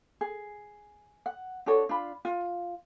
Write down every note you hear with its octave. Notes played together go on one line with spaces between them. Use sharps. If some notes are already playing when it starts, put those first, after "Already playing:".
G#4
F#5
D4 F#4 A4 C#5
D4 F4 B5
F4